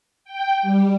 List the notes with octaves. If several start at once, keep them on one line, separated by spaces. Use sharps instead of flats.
G5
G3